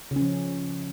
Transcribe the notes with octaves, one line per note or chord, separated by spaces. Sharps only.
C#3
C#4
F3